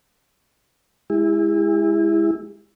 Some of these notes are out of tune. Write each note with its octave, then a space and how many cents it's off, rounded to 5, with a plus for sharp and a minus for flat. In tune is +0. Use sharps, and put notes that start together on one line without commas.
G#3 +0 E4 +0 G#4 -45